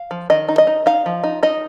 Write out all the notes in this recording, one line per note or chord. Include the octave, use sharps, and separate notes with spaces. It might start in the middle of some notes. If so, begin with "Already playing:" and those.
Already playing: F5
F3
D#3 D#5
D#4
D#5
D#4
D#4 F5
F3
D#4
D#4 D#5